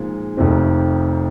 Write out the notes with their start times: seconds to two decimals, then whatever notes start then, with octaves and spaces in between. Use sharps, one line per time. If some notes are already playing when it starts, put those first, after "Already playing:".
Already playing: A#2 F3 G#3 D#4
0.37 F1 F2 C3 D#3 C4